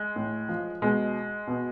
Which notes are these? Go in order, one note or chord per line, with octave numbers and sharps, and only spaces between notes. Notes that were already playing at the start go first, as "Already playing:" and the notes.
Already playing: G#3
A2
F3
B2 G#3
B2